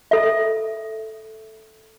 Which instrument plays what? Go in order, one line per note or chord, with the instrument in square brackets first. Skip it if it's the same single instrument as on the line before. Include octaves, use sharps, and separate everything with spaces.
[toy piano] A4 E5